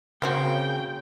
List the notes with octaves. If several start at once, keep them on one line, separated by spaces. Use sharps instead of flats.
C#3 A#3 C4 F#4 G5